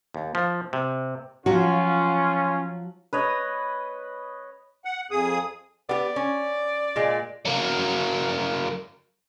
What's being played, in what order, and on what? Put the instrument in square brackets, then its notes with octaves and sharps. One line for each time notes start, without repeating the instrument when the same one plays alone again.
[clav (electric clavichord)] D#2
F3
C3
[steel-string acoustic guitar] F3 F#3 F#4 [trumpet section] C#4 F4
[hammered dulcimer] B4 C#5 D#5
[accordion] F#5
F2 G#4 D#6
[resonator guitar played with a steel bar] B3 G4 [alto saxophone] D5
[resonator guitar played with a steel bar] C#4
A#2 G#3
[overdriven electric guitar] F#3 A#3